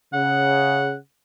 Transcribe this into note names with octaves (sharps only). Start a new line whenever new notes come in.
C#3 F#5